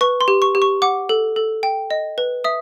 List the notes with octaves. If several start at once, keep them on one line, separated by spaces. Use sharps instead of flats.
B4 C#6
C6
G4
C#6
G4
C#6
F#5 D6
A4
A4
G5
D#5
B4
E5 D#6